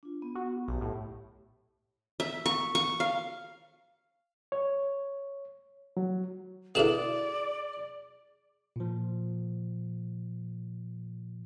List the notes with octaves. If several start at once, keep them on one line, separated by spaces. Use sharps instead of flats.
D4 F4
B3
F#4
B1 G4
A2
E5
C#6
C#6
F5
C#5
F#3
B2 D3 E4 G#4 D5 E7 F#7
A#2 F3